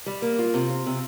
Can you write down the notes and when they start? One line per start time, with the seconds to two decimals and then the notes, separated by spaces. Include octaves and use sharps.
0.06 G3
0.22 A#3
0.39 F4
0.54 C3
0.69 F4
0.86 C3